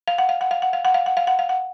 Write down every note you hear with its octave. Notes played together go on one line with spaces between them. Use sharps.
F5
F#5
F5
F#5
F5
F#5
F5
F#5
F5
F#5
F5
F#5
F5
F#5